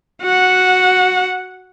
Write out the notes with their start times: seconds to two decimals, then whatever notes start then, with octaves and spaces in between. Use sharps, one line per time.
0.22 F#4 F#5